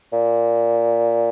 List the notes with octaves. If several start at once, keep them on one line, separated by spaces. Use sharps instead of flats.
A#2